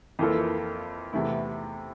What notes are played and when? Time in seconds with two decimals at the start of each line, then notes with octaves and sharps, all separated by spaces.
0.19 F2 E3 A#3 F4 A4
1.13 E2 C3 E3 A3 E4